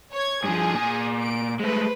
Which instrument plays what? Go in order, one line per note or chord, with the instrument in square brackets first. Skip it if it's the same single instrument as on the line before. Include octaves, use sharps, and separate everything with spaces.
[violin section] C#5 G#6
[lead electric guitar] G2 F3 [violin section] G#4
[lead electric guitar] A#2 G#5
[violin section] D7
[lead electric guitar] G#3 A3 [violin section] B4 C5